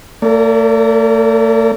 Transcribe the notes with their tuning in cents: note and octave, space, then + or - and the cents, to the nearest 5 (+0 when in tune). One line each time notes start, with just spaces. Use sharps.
A3 +40 A#4 -10 D5 -30